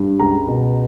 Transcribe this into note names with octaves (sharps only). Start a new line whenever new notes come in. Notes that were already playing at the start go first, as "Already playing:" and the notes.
Already playing: G2
C#2 A#5
B2